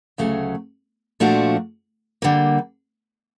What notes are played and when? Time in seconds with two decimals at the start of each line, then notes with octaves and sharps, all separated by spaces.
0.18 D2 C#3 F#3 A3
1.20 A#2 F3 A3 D4 F#4
2.22 D3 G3 A#3